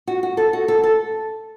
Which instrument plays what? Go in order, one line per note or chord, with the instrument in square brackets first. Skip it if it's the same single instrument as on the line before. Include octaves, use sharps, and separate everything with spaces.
[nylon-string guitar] F#4
F#4
A4
F#4
A4
A4